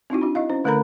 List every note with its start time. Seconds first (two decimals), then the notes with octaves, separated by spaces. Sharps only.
0.10 C4 D#4 E4 F#4
0.21 D4 F#4
0.35 E4 D#5 F5
0.50 C#4 C5
0.64 D3 A3 A4 A#4 A#5 B5